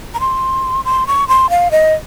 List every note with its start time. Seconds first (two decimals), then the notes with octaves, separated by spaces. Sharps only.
0.14 A#5
0.20 C6
0.85 C6
1.07 C#6
1.28 C6
1.50 F5
1.71 D#5